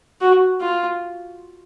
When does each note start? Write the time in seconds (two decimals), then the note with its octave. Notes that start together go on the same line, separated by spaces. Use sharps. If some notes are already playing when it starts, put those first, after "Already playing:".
0.21 F#4
0.61 F4